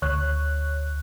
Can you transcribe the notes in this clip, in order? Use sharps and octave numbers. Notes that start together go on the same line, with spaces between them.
D2 C#5 F#6